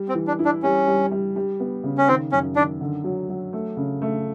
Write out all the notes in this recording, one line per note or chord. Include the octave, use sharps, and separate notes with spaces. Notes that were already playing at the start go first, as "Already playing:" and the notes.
Already playing: G3
C4
E3
D4
E4
D4
G3 C#4
G3
G3
G3
B3
C#3
C#4
D#3 C4
F#2 C#4
D#3 D4
D3
F#3
F#3
A3
C#3
A3